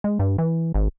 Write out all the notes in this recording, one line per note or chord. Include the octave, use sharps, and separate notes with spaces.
G#3
G2
E3
G#1